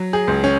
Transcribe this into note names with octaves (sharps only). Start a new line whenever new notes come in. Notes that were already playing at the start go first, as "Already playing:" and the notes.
Already playing: F#3
G#4
C#2
C#4